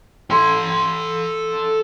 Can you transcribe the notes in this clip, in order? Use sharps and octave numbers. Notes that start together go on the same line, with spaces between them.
A4 C6